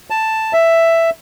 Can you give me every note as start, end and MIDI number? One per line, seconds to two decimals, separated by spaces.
0.10 0.53 81
0.53 1.10 76